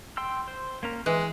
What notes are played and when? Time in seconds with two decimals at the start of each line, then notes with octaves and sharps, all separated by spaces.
0.17 G5 C6 E6
0.48 C5
0.83 A#3 C#4 A#4
1.06 E3 G#3 F#6